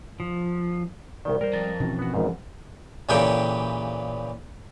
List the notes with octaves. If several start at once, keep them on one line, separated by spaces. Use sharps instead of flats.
F3
C2 D#3 D5
G3 A#4 C5
F2 A#5 A6 A#6
B2 D#3 E3 C4 C#4
B3 F#4
G#1 E2 G#2
A#2 C#3 E3 G4 A4 G5